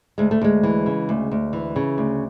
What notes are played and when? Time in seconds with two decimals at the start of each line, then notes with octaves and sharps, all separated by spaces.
0.18 D2 G#3
0.31 A3
0.41 D2 G#3
0.63 E3
0.86 C#3
1.09 D2
1.32 D2
1.53 E3
1.76 C#3
1.98 D2